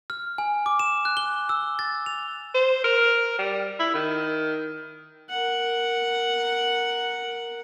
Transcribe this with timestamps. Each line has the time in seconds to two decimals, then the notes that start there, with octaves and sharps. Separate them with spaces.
0.10 F6
0.38 G#5
0.66 D6
0.79 E7
1.05 F#6
1.17 G7
1.49 E6
1.79 A6
2.06 F7
2.54 C5
2.84 A#4
3.39 G3
3.79 E4
3.94 D#3
5.30 A#4 F#5